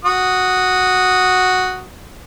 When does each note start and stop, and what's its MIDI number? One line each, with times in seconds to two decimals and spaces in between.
0.05 1.83 66
0.05 1.83 87